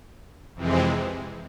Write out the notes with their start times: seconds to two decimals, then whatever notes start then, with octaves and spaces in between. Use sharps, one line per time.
0.55 F2 C3 E3 G#3 C4